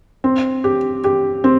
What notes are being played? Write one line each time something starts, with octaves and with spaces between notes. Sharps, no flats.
C4
G4
G4
C4